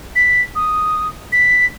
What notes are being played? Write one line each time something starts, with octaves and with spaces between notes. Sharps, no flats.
B6
D#6
B6